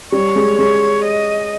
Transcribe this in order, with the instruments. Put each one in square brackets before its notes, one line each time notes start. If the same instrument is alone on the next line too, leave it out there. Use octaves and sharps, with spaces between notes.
[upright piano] G3 [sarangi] C#5
[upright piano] G#3
[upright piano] G#3 [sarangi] C#5
[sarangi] D#5